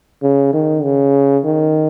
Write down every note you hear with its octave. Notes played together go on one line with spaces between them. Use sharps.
C#3
D#3
C#3
D#3